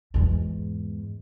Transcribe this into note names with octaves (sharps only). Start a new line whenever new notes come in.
E2 G#2